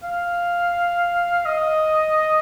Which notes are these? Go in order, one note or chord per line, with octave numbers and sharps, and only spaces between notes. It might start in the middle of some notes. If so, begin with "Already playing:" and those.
F5
D#5